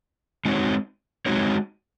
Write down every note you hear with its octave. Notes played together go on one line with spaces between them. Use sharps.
G#3 C4 D#4 F#4 C#5
G#3 C4 D#4 F#4 C#5